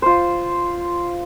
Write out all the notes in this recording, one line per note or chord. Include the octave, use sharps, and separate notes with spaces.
F4 C5